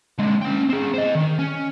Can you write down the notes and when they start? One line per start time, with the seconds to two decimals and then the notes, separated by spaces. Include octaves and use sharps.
0.18 D3 G#3
0.42 C#4 G5
0.69 C4 G#4
0.94 C5 D#5
1.15 D#3
1.39 C#4